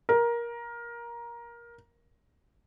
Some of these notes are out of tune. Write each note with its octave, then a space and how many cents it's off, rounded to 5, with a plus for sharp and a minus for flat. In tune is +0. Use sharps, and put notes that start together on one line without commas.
A#4 +15